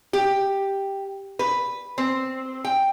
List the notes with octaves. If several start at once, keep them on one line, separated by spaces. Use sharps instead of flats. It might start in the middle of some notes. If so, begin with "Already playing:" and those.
G4
B4
C4
G5